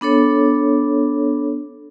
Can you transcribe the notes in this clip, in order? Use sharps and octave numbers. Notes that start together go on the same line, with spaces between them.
B3 D4 A4 C#5